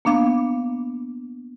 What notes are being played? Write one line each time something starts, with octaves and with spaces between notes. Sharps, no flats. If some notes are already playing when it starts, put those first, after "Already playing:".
A#3 B3 D4 F5 D6